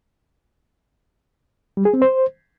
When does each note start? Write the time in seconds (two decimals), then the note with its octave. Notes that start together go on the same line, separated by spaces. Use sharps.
1.77 G3
1.85 G#4
1.94 C4
2.02 C5